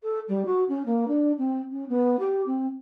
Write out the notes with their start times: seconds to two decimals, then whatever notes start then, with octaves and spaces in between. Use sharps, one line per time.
0.03 A4
0.28 G3
0.45 F#4
0.68 C#4
0.85 A#3
1.07 D4
1.38 C4
1.71 C#4
1.88 B3
2.19 G4
2.46 C4